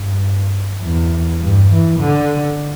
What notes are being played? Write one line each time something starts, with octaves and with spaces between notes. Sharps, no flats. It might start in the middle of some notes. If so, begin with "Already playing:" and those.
Already playing: G2
E2
G2
E3
D3